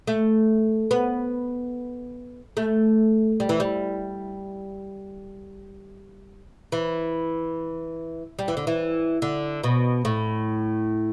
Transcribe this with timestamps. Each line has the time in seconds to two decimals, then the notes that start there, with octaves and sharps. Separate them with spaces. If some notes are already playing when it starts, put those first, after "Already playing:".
0.07 A3
0.91 B3
2.57 A3
3.40 G3
3.49 E3
3.60 G3
6.72 E3
8.39 G3
8.48 E3
8.57 D3
8.67 E3
9.22 D3
9.64 B2
10.05 A2